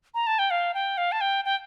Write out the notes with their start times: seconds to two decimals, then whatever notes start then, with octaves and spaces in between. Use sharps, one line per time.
0.14 A#5
0.27 A5
0.39 G5
0.51 F5
0.74 G5
0.98 F5
1.12 A5
1.21 G5
1.45 G5